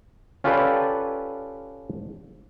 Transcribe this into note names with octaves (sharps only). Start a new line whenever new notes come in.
C#4 F4 G4 A4 B4 D5